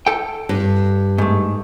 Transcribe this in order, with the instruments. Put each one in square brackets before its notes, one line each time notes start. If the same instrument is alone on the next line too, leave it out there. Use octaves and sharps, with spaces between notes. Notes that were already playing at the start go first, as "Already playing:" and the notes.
[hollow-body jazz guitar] A4 G5
[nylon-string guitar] G2
[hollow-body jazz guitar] G#2 A3